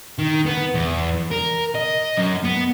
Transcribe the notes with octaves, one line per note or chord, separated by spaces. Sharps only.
D#3
B3
E2
A#4
D#5
F#2
B3